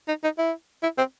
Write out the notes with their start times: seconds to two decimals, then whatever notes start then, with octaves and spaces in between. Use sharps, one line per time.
0.08 D#4
0.24 D#4
0.38 E4
0.83 E4
0.98 C4